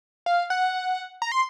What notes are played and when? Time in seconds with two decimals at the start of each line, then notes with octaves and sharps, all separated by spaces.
0.26 F5
0.50 F#5
1.22 A#5
1.32 C6